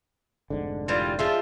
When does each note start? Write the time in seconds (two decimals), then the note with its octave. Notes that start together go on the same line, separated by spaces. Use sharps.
0.50 F1 G#2 D3
0.88 E3 G3 F4
1.19 F3 G#3 F4 E5